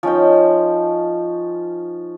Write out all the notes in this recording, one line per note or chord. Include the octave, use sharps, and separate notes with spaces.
F3 C#4 D#4 G5